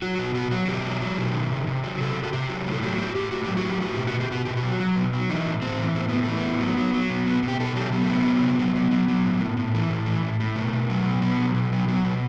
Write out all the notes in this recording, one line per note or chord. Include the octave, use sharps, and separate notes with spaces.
F#3 F#4
B2 F#4
F#3 F#4
F#3 F#4
B2 G4
F#3
F#3
B2
D#3
C3
C3
F#3
C3 A4
C3
F#4
C3 G4
F#3
A2
A4
F#3 G4
A2 G4
F#4
A2 G4
A2 F#4
F#3 G4
F#4
A2
G4
A2 F#4
B2 G4
F#4
B2
G4
B2 F#4
B2 G4
F#4
F#3
F#3
B2
F#3
E3 D#4
A2
A2 C4
E3
A2 C4
A2 B3
A3
E3
B3
A2
F#3
F#3
F#3
B2
B2 B3
B2
G4
B2 A4
F#3 G4
F#3 B3
A3
C3 B3
F#3
C3
F#3
F#3
F#3
F#3
A2
A2
A2
E3
A2
E3
A2
A2
B2 A3
B2
F#3
B2
B2 B3
F#3
B2
F#3
F#3
B2